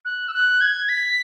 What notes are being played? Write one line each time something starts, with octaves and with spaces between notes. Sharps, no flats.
F#6
E6
F#6
G#6
B6